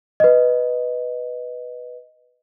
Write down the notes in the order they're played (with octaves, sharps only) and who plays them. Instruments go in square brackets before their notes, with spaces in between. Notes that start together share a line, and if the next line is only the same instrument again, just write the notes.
[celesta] B4 D#5